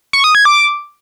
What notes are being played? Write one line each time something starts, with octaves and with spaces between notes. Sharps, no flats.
C#6
D#6
G#6
D6